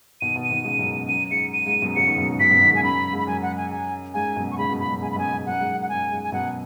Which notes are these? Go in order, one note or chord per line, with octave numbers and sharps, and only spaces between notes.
B2 D#3 D#7
B2 D#3
D#7
B2 D#3
G#2 C#3
F#2 B2
F#2 D#7
G#2 C#7
D#7
G#2
F#2 B2
C#3 F#3 C#7
B2 D#3
F#2 B2
G#2
F#2 B2 B6
F#2 B2
B2 D#3
G#2 C#3 G#5
F#2 B5
G#2
B5
F#2 G#5
F#5
G#5
G#5
G#2 G#5
F#2 B2
C#6
G#2 C#3 B5
F#2 B2
G#2 B5
F#2
G#2 G#5
B5
F#2 B2 G#5
G#2
F#2 F#5
G#2
F#2
F#5
F#2 G#5
G#2
G#5
F#2 B2 F#5